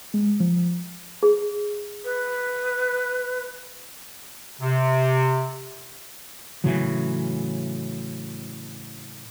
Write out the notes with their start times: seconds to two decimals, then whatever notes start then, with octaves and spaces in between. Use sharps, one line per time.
0.14 G#3
0.40 F3
1.23 G#4
2.04 B4
4.60 C3
6.64 A2 C#3 E3 F#3